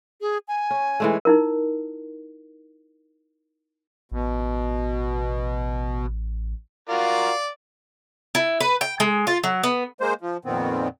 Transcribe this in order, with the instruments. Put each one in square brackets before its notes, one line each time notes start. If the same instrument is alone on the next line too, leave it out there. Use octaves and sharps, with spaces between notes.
[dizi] G#4
G#5
[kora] C#4
E3 G#3 A3
[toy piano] D#4 E4 A#4
[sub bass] A1 [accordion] B2
[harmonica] F4 F#4 A#4 [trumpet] D5 [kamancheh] F5
[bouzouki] E4
B4
G5
G#3
F4
F#3
B3
[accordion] G#3 A#3 C5
F3
F2 A#2 D#3 B3 C4